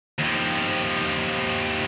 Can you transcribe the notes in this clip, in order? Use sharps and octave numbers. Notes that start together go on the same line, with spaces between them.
D#2 F3